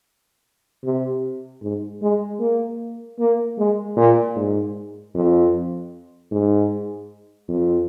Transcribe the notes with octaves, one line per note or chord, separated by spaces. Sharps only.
C3
G#2
G#3
A#3
A#3
G#3
A#2
G#2
F2
G#2
F2